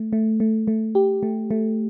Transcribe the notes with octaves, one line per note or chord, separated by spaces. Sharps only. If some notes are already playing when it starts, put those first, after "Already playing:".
Already playing: A3
A3
A3
A3
G4
A3
A3